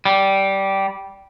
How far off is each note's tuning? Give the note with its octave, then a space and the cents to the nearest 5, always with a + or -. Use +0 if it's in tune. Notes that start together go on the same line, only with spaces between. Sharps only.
G3 -10